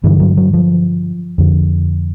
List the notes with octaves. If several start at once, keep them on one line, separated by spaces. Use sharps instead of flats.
G2 D3 E3
F#3
F#3
F3
F2 D3